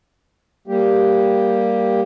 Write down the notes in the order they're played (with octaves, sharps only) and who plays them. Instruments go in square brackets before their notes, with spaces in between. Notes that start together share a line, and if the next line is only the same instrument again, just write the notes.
[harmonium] G3 A#3 G4